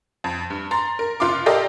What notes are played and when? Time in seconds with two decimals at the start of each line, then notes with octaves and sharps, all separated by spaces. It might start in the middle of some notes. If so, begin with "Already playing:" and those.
0.24 F2
0.50 G2
0.71 A#5 C6 A6
0.99 A#4
1.20 F#1 F4 C6 D6
1.46 G4 A4 A#4 D5 D#5 F5